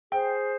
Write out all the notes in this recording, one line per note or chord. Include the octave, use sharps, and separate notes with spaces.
G#4 C5 G5